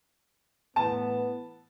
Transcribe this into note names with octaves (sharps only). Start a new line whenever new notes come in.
A2 E3 B3 A5